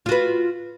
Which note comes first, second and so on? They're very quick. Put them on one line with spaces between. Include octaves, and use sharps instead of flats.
F4 F#4 B4